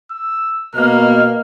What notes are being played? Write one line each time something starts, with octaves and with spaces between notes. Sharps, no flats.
E6
B2 A#3 D#5 F6